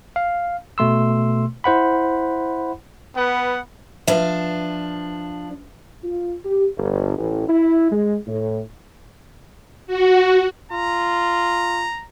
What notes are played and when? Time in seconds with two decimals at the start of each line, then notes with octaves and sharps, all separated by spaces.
0.16 F5
0.78 B2 A3 C6 E6
1.64 E4 C5 F#5 B5
3.16 B3 B4 F#5
4.07 F3 D4 B4 E5
6.04 F4
6.44 G4
6.77 G1
7.18 A1
7.49 E4
7.91 G#3
8.27 A2
9.87 F#4
10.72 F4 A#5